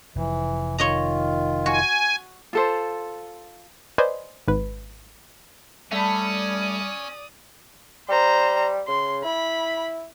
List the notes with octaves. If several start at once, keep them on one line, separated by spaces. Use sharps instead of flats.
F1 E3 F3
D#3 F4 C#5 D#5 A#5
F#4 G#5
F4 A4 C5
B4 C5 D5 D#5 G#5
G#1 G#2 B4
G3 A3 C#4 D5 B5 D#6
G3 C5 A#5
C#3 C6
E4 B5